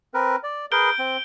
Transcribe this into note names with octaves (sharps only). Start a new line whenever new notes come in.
C4 A#4 B4
D5
G#4 A#4 B4 G6 D7 G7
C4